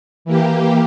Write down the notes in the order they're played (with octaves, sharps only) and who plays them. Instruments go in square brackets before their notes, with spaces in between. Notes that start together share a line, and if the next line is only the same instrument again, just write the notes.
[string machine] E3 A#3 G4